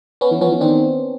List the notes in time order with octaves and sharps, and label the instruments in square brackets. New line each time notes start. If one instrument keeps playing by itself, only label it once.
[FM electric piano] B3 C#4
[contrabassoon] E3
[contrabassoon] F3 [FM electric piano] B3 C#4
[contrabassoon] E3
[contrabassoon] D#3 [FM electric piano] C4 D4